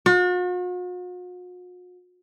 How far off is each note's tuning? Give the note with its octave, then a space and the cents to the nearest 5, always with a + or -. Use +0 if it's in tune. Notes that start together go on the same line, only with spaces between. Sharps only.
F#4 -45